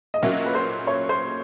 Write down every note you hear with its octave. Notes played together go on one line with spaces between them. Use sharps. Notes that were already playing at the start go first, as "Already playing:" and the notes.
D#5
A#2 F#3 A#3 C#4 F#4 E5
B4
C5
C#5
C5